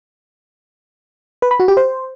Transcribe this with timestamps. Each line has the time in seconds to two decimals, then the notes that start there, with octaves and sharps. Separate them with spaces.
1.42 B4
1.51 B5
1.60 F#4
1.68 G4
1.77 C5